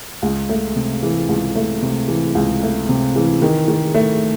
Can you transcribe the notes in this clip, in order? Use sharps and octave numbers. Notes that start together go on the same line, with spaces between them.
C#2
A3
C3
E3
C#2
A3
C3
E3
C#2
A3
C3
E3
D#3
D#3
A3